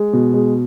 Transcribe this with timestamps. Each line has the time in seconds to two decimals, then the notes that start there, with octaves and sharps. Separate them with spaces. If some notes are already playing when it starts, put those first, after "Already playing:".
Already playing: G#3
0.13 B2
0.34 G#3